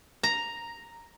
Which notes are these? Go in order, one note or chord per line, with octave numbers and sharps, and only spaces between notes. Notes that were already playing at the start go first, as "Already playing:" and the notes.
A#5